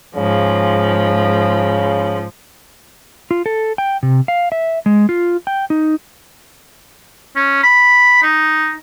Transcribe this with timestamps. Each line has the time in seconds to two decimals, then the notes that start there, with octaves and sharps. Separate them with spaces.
0.15 G#2 C#3 F3
3.31 F4
3.46 A4
3.78 G5
4.03 C3
4.28 F5
4.52 E5
4.86 G#3
5.09 F4
5.47 G5
5.70 D#4
7.36 C#4
7.63 B5
8.23 D#4